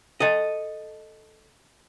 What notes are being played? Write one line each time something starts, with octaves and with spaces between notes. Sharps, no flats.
A4 D#5